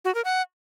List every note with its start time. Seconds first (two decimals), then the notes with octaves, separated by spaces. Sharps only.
0.05 F#4
0.15 A#4
0.25 F#5